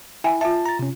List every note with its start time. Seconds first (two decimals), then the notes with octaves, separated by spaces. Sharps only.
0.24 E4 E5 G5 G#5
0.41 F4 E5 A5
0.66 A#5 A6
0.79 C3 C#4